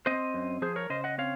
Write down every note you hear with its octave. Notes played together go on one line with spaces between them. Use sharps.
C4 C5 D#5
F#2
F3 G#4 C5
A#4 C#5
C#3 C5 D#5
D#5 F#5
C4 C#5 F5